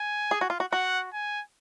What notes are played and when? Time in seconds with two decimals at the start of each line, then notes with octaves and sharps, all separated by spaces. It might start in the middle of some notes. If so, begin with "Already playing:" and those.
Already playing: G#5
0.31 G#4
0.41 F#4
0.50 F4
0.60 F#4
0.72 F#4 F#5
1.13 G#5